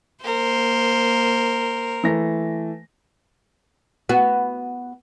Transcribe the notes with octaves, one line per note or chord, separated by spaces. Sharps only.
A#3 A#4 C5
E3 A3 A#6
B3 F#4